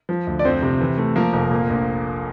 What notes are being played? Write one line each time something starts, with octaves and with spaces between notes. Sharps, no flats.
F3
D2
D5
F2 C4 C5
C3
E3
A3
F3 A#3 A#4
F1
A#2
A#1